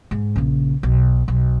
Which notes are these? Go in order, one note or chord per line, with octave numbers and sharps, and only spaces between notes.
G#2
A#1 C#3
B1
B1